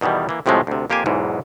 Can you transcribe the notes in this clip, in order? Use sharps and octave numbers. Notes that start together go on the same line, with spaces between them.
E2 B2 D#3 E3 G3
E3 A#3
F2 A2 C3 F3 G#3 A3
D2 C3
F2 A#3 G4 C5 G#5
B1 E2 G#2 E3